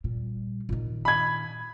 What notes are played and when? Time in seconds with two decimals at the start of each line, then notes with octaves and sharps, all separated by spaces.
0.04 A#2 G3
0.69 A#2 D#3
1.05 B5 G#6